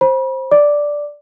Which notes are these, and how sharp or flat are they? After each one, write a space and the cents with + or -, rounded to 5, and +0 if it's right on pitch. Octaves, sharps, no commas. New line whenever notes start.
C5 +15 B5 -35
D5 +0 D6 +0